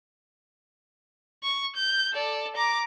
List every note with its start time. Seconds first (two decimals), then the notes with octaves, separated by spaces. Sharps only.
1.43 C#6
1.76 G6
2.14 A4 D5
2.56 A#5 D6